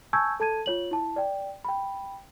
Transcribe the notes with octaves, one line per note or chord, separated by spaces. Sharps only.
G#5 A5 C#6 E6 G6 G#6
A4 A5 G#6 D#7
F4 C#5 F#7
E4 A5
D5 G5
G5 B5